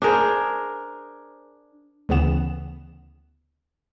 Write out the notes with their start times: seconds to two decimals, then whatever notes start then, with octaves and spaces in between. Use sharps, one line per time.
0.02 D4 G#4 A#4 C5
2.09 D2 C#3 E3 B3 E7